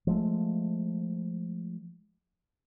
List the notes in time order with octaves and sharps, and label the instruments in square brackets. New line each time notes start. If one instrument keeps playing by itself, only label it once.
[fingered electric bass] F3 G#3 A3